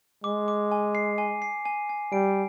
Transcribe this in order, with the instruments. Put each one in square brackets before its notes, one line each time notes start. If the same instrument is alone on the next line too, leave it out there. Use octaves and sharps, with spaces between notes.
[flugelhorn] G#3 [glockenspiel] D6
[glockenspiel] D6
G#5
C7
G#5
C7
G#5
G#5
[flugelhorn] G3 [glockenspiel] D7